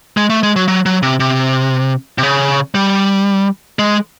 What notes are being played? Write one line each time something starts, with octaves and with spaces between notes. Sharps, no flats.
G#3
A3
G#3
F#3
F#3
F#3
C3
C3
C3
C#3
G3
G#3